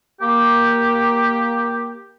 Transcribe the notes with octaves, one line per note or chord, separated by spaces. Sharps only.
A#3 G4